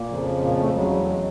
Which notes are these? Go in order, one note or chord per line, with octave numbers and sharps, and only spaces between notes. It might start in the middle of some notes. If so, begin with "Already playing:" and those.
Already playing: A#2 A#3
F2 C#3 F3
A#2 A#3
A2 A3
E2 C#3 F#3 G#3
G3
A3
G#3